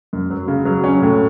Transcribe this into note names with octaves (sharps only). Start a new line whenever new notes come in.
F#2
F#3
C#3
F#3
C#4
A2